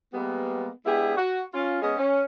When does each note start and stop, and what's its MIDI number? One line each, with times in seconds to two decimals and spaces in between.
0.14 0.68 55
0.14 0.68 56
0.14 0.68 58
0.14 0.68 59
0.86 1.17 56
0.86 1.17 59
0.86 1.17 62
0.86 1.17 64
0.86 1.17 67
0.86 1.17 68
1.17 1.42 66
1.54 1.80 61
1.54 1.80 65
1.82 1.96 56
1.82 1.96 59
1.82 1.96 61
1.82 1.96 68
1.82 1.96 75
1.98 2.23 61